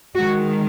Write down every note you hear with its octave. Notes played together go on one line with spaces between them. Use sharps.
D#3 G#3 F#4